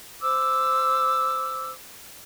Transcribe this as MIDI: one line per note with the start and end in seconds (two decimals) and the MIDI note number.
0.21 1.70 72
0.21 1.70 86
0.21 1.70 88